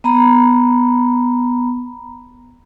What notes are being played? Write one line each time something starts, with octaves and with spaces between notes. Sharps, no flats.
B3 A#5 B5